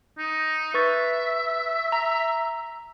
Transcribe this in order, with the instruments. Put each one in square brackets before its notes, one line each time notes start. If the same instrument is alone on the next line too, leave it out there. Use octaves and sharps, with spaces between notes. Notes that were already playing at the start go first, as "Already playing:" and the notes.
[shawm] D#4
[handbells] B4 C#6 A6 [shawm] E5
[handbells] A#5